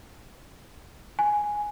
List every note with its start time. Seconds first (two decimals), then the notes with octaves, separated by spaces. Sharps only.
1.19 G#5